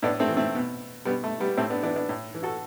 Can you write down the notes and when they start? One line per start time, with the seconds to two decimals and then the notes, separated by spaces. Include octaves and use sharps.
0.02 A2 B3 D4
0.20 A3 C4
0.29 E3
0.37 A3 C4
0.55 B2
1.05 B2 G3 B3
1.24 A3
1.40 G3 B3
1.57 A2 A3 C4
1.70 B3 D4
1.83 E3 B3 D4
1.95 B3 D4
2.09 A2
2.35 E3
2.43 F#4 A4